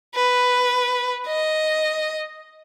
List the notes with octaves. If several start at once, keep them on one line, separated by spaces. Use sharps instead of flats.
B4
D#5